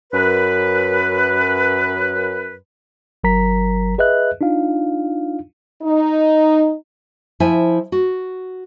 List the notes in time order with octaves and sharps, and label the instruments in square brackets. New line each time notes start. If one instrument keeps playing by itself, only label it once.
[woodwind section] F#2 B4
[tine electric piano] G1 F#3 A#4 A#5 B6
G#4 B4 D#5 E5 F#6
D4 D#4 F4 F5
[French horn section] D#4
[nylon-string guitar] F3 E4 C5 E5 G#5
F#4